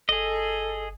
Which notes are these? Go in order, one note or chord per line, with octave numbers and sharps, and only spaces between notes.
G1 G#4 A4 D#5